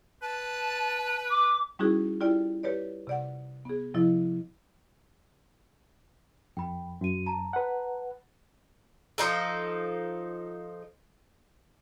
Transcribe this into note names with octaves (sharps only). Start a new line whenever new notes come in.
B4 A5
D6
G3 C#4 D#4 E4 F#4 G#4
E4 F4 G4 D5 G5
G4 B4 C#5 D5
C3 D5 F#5
B3 G#4
C3 F3 E4 D#5
F2 G5 B5
F#2 F#4 D#7
A5 A#5
B4 F#5
F3 D#4 A4